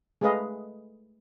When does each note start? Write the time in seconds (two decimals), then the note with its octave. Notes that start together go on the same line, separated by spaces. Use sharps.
0.21 G#3 A3 G#4 B4 D#5 F5